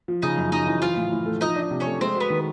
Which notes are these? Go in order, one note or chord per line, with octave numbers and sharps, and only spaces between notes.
F3
C#3 D#4 D#5
F#2
F#2 D#4 D#5
E3
F3 F4 F5
A2
A2
A3
F3 D#4 D#5
D4
C3
C#4 C#5
A3
G#3 C4 C5
B3 F#4 B4
D#3